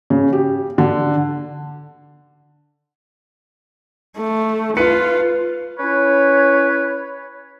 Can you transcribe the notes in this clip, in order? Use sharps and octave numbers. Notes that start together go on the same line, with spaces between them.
C#3
G4
D3
A3
F4 B4 C#7
C#4 E4 B4 C#5